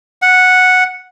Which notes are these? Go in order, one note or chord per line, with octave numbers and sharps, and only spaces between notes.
F#5